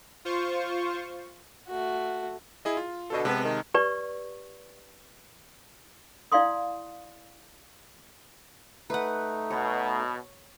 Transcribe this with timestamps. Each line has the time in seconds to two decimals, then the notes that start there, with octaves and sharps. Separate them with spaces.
0.25 F4 C5 C#6
1.68 A3 F#4
2.65 E4 G#4 D#5
2.77 F4
3.10 B2 D3 A4 D#5
3.25 C3 G#3 B3 A5
3.43 D#3
3.74 G4 B4 D5 C#6
6.32 E4 D5 F5 G5 C6 D#6
8.90 A3 D#4 B4 F#5
9.51 B2 C#5